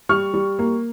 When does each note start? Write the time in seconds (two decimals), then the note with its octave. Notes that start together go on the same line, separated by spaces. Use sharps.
0.09 G3 C#6 F6
0.34 G3
0.59 A#3